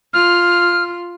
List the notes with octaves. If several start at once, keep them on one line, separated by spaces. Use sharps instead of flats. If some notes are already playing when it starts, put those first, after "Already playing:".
F4 F6